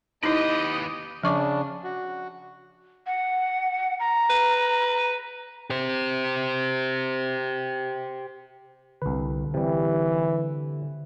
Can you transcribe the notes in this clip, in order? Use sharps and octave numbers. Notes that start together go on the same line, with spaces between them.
D#2 D#4 E4 G4 B4 D#5
C#3 F3 D4 C#6 D6
F#4
F#5
A#5
B4
G4 C5
C2 D3 B4
C3 E3 G3